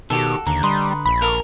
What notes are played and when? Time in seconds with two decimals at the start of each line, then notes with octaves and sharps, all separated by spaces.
0.10 B2 D#3 F#4 G4 A4
0.47 D#2 D3 A#5
0.63 G3 B4 D#5 C6
1.06 A#1 B5
1.22 A4 A#4 F5